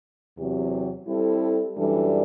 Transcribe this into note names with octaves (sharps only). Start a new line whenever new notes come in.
E2 C3 F#3 C4 G4
G3 C4 E4 A4
F#2 E3 G3 D4 A4